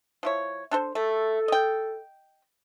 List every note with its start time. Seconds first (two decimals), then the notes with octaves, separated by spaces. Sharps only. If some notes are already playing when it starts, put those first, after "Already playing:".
0.23 F3 E4 C#5
0.71 D4 A4 C5
0.95 A3 A4
1.48 D#5 G5